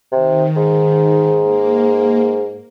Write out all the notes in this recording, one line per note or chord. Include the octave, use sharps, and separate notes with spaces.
C3 D#3
G#2
A#3